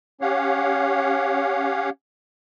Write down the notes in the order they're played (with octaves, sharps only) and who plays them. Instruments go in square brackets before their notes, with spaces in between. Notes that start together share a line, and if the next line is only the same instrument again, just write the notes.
[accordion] C#4 G4 C#5 F5 F#5